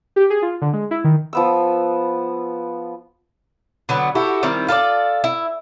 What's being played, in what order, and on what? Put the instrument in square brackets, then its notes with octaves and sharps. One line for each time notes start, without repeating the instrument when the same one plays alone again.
[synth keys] G4
G#4
F4
D3
G#3
E4
D#3
[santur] F3 B3 E6
[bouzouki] D3 F#3 B3
E4 F#4 G4 A4
D#3 G3 C4 E4
F4 A4 C5 D5
E4